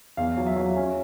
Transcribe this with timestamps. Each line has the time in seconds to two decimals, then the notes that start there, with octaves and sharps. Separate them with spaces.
0.17 E2 F5
0.36 F#3
0.46 E5
0.56 F#3
0.76 C#4